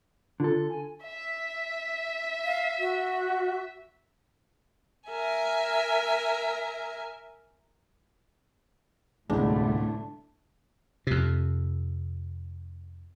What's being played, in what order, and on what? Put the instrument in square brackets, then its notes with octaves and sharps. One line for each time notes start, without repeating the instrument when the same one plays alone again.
[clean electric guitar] D3 A4 [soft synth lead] F4
[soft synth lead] G#5
[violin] E5
[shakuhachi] F5
F#4
[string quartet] A#4 E5 G#5
[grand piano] D1 G1 C2 [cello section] A2 A3 [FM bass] G#3 [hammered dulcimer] D4 E4
[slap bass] F2 C3